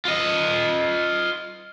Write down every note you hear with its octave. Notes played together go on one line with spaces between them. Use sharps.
F4 D#5